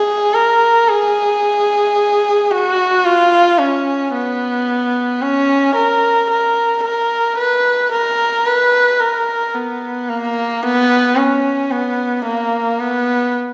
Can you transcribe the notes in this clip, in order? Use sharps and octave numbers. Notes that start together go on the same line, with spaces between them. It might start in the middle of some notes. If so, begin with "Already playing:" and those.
Already playing: G#4
A#4
G#4
F#4
F4
C#4
B3
C#4
A#4
A#4
A#4
B4
A#4
B4
A#4
B3
A#3
B3
C#4
B3
A#3
B3